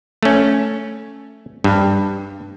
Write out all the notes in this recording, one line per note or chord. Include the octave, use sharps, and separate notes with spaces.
A3 C#4
G2